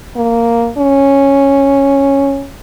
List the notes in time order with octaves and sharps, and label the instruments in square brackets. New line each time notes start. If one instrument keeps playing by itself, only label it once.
[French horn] A#3
C#4